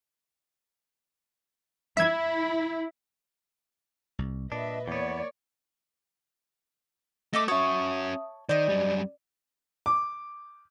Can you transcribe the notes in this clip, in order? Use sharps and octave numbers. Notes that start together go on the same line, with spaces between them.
E4 E5 G#6
C2
A#2 D4 B4 D#5 E5
E2 A#3 B3 C#5 D5
A3 D#5 E5 D6
C#4 F#4 C#5 E5 A5 C#6 D#6
D#3 C5 D5 D#5
F#2 G3
D6